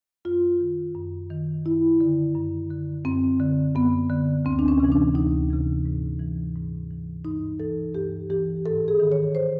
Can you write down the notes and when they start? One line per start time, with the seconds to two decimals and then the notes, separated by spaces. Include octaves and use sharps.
0.25 F#2 F4
0.60 D#3
0.95 F#2
1.30 D#3
1.66 F#2 E4
2.01 D3
2.35 F#2
2.70 D3
3.05 F#2 C4
3.40 D3
3.75 F#2 B3
4.10 D3
4.45 D2 C4
4.59 D4
4.68 C#4
4.80 C3 E3
4.92 D4
5.15 D2 D#4
5.50 C3 E3
5.85 G#2
6.20 E3
6.56 G#2
6.91 E3
7.25 G2 D#4
7.60 E3 A4
7.95 G2 G4
8.30 E3 G4
8.65 G#2 A4
8.88 G#4
9.00 D#3
9.12 C#5
9.35 C5